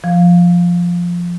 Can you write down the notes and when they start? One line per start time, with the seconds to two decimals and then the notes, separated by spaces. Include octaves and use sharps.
0.04 F3